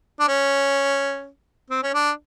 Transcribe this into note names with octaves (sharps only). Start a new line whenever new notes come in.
D4
C#4
C4
C#4
D4